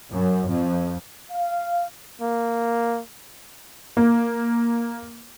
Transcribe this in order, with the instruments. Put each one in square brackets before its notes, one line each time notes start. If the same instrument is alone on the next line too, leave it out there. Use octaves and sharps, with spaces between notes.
[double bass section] F#2
F2
[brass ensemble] F5
[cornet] A#3
[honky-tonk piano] A#3